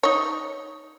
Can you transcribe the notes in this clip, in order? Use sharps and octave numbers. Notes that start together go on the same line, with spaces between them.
D#4 C#5